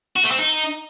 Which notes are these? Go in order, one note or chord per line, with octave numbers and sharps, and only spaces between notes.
F#4
A3
C4
D#4